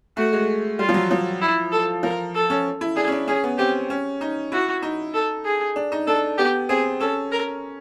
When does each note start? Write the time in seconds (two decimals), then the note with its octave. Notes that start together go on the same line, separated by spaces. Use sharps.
0.17 A3 F#4
0.33 G#3
0.79 G3 F4
0.89 F3
0.94 F#3
1.11 F3
1.41 E4
1.72 A4
2.03 F3 A#4
2.34 A4
2.50 C#4
2.81 E4
2.96 D4 G#4
3.08 C#4
3.12 D4
3.28 C#4 G#4
3.44 B3
3.58 C4 G4
3.90 C#4
4.21 D#4
4.52 E4 F#4
4.82 D#4
5.14 A4
5.45 G#4
5.76 D4
5.92 D#4
6.07 D4 A4
6.38 B3 G4
6.69 C4 G#4
7.00 C#4 A4
7.31 A#4